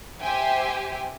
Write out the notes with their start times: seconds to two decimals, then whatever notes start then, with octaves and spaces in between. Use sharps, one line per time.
0.21 G4 C5 E5 G5 G#5